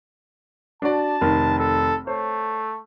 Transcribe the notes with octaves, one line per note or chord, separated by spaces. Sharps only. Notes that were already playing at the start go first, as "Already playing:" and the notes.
D4 F#4 D5 A5
F1 D#3 F6
A4
A3 C5 C#5